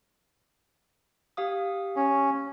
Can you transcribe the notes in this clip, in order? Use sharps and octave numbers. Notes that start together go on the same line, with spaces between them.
G4 F5 D#6
C#4